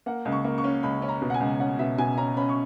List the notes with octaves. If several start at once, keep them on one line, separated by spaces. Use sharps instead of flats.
A#3 F#5
C#2
C#6
A#3
C#6
C#4
C#2 B5
C#4
A#5
B2
F#5
G#5
C#2
C#4 F#5
B2 E5
B2 G#5
C#4 A#5
C#4 B5
C#6